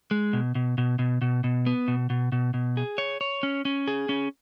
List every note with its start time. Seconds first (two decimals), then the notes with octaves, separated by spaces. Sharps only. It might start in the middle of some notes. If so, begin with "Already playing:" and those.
0.11 G#3
0.33 B2
0.55 B2
0.78 B2
0.99 B2
1.22 B2
1.44 B2
1.66 B3
1.88 B2
2.10 B2
2.32 B2
2.54 B2
2.77 G#4
2.98 C#5
3.21 C#5
3.43 C#4
3.65 C#4
3.88 G#4
4.09 C#4